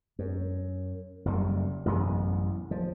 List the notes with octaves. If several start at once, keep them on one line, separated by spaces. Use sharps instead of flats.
F#2
F#1 F#2 G3
A1 F#2 C3 B3
F3